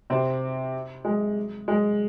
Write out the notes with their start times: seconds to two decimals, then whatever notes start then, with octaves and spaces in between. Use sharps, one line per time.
0.10 C3 C4
1.05 G#3
1.68 G#3